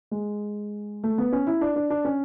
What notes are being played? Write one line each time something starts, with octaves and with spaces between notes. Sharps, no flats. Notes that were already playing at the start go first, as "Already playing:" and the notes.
G#3
A3
B3
C#4
E4
D4
D4
D4
C#4